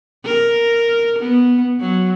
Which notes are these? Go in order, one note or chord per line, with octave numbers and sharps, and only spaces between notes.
A#4
B3
F#3